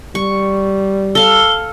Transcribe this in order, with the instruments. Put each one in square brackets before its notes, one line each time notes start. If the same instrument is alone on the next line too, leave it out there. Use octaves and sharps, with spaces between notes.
[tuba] G3 [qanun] C#6
[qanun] A4 F5 [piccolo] G7